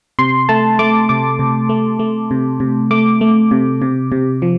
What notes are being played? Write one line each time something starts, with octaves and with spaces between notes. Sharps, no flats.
C3 C6
A3 A5
A3 D6
C3 D6
C3
A3
A3
C3
C3
A3 D6
A3
C3
C3
C3
F3